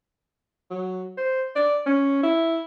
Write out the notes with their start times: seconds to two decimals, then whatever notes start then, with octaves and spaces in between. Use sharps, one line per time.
0.70 F#3
1.17 C5
1.56 D5
1.86 C#4
2.23 E4